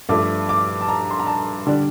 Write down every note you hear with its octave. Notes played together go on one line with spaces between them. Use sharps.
G2 F3 A3 D6
D6
A5
A#5
C6
A#5
A5
D3 G3 D4